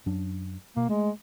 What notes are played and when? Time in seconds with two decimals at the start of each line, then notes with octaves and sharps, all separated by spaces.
0.06 F#2 F#3 D4
0.77 B2 A#3
0.89 G#3 A3